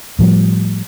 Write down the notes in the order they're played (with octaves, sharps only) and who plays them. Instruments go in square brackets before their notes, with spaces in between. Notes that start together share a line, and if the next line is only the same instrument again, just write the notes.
[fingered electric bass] A2 F3 G3